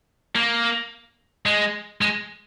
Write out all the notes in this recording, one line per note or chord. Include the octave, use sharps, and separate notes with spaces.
A#3
G#3
G#3